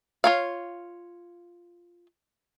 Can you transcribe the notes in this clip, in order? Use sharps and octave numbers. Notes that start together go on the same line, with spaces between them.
F4 C#5 F5